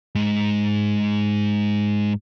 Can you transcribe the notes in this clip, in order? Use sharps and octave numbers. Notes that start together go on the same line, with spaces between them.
G#2 G#3